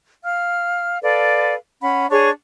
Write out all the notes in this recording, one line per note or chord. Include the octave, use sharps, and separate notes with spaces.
F5 F6
A4 B4 D5 F5
C#4 F#5 B5
D4 G#4 C#5 C#6